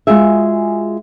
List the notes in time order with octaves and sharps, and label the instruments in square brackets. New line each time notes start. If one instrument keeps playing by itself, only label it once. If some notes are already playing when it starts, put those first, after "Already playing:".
[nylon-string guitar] G#3 F4 F#4 G#4 E5